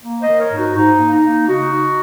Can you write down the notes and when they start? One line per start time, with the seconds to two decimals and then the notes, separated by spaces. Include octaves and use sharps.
0.03 A#3
0.21 C5 D#5
0.28 D#3
0.39 A#4 C#5
0.51 G#2
0.57 D#4 F#4
0.75 G#2 D#4
1.00 A#3
1.12 D#4
1.24 A#3
1.48 C#3 D#4 F#4
1.73 D#4